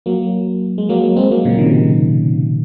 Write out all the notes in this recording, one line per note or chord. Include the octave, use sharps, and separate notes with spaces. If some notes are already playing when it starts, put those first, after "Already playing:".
F#3 A#3
G#3
F#3 A#3
G#3 C4
F#3 A#3
A#2 C#3
C3 D#3